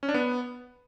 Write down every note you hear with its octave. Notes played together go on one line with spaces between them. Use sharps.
C#4
D4
B3